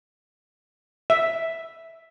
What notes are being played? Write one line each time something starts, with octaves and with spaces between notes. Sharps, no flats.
E5